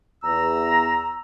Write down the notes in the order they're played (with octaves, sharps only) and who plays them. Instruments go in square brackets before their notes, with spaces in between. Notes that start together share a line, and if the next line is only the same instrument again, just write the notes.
[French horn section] E2 [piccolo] A#5 [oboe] E6